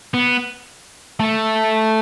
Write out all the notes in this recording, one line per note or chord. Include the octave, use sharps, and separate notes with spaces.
B3
A3